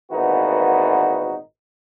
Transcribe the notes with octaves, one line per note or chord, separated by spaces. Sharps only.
G#1 A#2 E3 B3 D#4 F#4